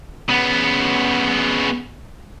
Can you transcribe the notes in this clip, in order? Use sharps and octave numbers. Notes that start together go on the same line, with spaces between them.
C#3 B3